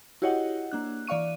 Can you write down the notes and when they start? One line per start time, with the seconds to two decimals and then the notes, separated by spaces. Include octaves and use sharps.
0.22 E4 F#4 G4 C#5 D#5 F#5
0.71 A#3 D4 F#6
1.07 E3 D5 F5 C#6 D#7